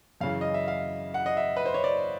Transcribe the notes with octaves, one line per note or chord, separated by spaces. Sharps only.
F#2 C#3 E3 F5
D#5
E5
F5
F#5
D#5
E5
B4
C5
C#5
D5